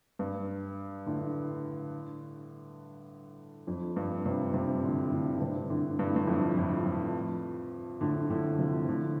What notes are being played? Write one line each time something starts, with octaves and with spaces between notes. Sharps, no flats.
G2
A2 D3
F2
G2
G2 C3
G2 C3
A2 D3
A2 D3
D3
G2 C3
A2 D3
G2
A2
G2
F2 A2
F2 A2
F2
A2 D3
A2 D3
C3 F3
A2 D3